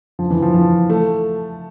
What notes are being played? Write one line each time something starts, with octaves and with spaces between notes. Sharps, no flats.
F3
E3
F3
F3
A3